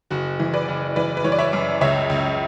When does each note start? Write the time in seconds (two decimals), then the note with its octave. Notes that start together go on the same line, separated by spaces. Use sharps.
0.10 F#1 F#4
0.39 E3
0.54 B4 D5
0.68 F#1
0.96 E3 B4 D5
1.17 B4
1.24 E3 C#5
1.32 D5
1.39 C#5 E5
1.53 F#2
1.81 C#2 C#5 E5
2.10 C#2